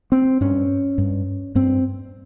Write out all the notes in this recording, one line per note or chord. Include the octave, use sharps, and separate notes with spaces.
C4
G2 C#4
G2
G2 C4